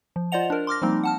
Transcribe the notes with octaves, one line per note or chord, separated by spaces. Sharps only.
F3
F4 C5 D5 D#5 F#5 F7
D4 A#4
C6 D6 F6 A#6
F3 G3 A#3 C4 D#4
F#5 A5 F6